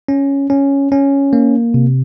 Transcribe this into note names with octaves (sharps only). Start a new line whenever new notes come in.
C#4
C#4
C#4
A#3
C3